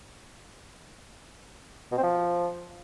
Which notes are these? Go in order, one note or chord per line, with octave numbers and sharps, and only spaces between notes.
B2
C4
F3